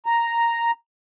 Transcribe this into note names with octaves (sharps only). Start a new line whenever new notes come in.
A#5